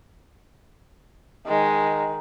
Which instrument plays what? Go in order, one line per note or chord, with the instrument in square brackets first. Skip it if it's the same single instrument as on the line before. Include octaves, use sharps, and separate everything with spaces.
[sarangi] D#3 [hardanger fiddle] G#3